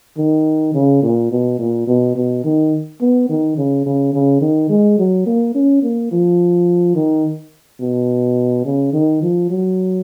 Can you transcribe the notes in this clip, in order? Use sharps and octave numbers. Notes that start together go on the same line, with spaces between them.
D#3
C#3
A#2
B2
A#2
B2
B2
D#3
B3
D#3
C#3
C#3
C#3
D#3
G#3
F#3
A#3
C#4
A#3
F3
D#3
B2
C#3
D#3
F3
F#3